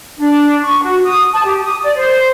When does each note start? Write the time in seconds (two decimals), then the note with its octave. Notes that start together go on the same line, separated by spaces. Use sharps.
0.18 D4
0.64 C#6
0.82 F#4
1.05 D#6
1.33 A5
1.44 G4
1.63 D#6
1.83 D5
1.96 C5